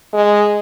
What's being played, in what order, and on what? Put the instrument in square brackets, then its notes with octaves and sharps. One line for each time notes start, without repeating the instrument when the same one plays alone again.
[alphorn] G#3